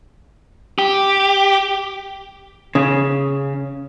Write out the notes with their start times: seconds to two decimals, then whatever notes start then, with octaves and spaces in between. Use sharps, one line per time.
0.79 G4
2.75 C#3